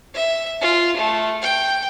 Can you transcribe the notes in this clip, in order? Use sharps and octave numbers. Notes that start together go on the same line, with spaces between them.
E5
F4
A3
G5